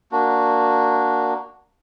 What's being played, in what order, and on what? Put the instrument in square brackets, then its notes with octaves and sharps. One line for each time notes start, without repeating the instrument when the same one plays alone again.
[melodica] A#3 D4 F#4